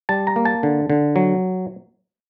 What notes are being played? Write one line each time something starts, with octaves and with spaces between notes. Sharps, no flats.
G3 A5
A#5
A#3
A5
D3
D3
F#3